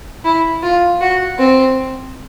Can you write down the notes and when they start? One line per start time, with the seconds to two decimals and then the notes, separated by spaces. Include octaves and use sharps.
0.24 E4
0.63 F4
1.01 F#4
1.38 C4